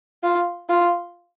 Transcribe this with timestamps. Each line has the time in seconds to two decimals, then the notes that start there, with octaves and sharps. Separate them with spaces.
0.23 F4
0.69 F4